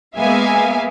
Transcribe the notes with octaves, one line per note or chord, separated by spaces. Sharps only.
G#3 A#3 B3 E5 F5 G#5